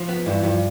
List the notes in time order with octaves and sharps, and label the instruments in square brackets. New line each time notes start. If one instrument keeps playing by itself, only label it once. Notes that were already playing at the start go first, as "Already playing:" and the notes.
Already playing: [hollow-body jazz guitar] F3
B3
[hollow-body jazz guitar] G2 [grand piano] E3
[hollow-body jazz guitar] G2 [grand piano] F3